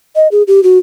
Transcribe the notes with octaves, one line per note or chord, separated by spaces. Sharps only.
D#5
G#4
G4
F#4